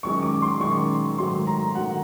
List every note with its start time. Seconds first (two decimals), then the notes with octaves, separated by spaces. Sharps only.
0.03 F#2 D#3 G#3 C#6
0.22 D6
0.42 C6
0.60 F#2 D#3 G#3 C#6
1.18 G#2 D#3 F#3 A3 C6
1.47 A#5
1.75 D#3 F#3 A3 F#5